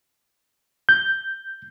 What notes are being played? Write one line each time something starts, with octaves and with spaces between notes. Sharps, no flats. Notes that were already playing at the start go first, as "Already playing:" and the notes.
G6